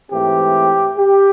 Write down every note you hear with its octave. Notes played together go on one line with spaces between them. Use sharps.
G#2 E3 A3 C4 G4
G4